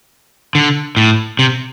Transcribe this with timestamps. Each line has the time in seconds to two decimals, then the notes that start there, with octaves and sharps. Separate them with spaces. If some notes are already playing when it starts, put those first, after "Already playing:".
0.55 D3
0.97 A2
1.39 C3